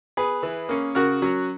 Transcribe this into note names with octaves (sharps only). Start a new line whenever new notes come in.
B3 G#4 B4
E3
A#3 C#4
C#3 F#4 A#4
F#3 C#4